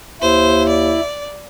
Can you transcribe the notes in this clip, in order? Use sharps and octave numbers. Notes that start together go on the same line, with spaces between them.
D#2 E4 C5
D5